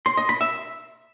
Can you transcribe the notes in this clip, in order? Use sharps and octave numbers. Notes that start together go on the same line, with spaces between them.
C6
D#5
B5
E5